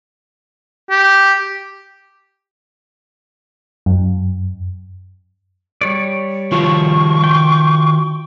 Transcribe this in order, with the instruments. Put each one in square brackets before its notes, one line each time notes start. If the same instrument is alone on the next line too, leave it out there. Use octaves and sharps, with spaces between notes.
[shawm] G4
[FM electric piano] F#2
[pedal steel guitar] G3 C#5 D5
[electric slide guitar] D#3 F4 F#4 [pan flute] C#6
[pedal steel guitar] G5